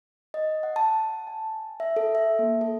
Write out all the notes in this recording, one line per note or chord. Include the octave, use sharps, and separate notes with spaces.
D#5
F#5
A5
G#5
E5
A4
E5
A#3
A4